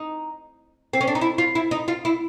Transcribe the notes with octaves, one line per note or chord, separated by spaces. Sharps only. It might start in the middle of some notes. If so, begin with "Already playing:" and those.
Already playing: D#4
C4
C#4
D4
D#4
E4
F4
E4
D#4
F4
E4